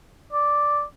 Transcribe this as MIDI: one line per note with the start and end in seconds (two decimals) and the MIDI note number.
0.33 0.83 74